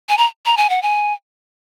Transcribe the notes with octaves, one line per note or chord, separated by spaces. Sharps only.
G#5
A#5
A#5
G#5
F#5
G#5